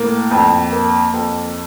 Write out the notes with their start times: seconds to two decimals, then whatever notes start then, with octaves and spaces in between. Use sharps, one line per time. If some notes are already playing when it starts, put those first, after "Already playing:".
Already playing: A2 A#3
0.31 F2
0.72 A#3
1.14 F2